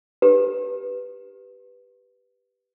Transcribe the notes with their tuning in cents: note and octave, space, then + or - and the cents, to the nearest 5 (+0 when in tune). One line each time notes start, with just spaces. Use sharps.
G4 +0 B4 +0